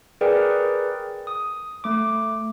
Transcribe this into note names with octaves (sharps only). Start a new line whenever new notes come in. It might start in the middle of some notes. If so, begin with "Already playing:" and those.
G#4 A#4 B4 D5 G5
D#6
A3 D6